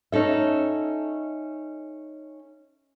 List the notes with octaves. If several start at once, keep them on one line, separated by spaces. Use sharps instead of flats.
C#4 D#4 A4 E5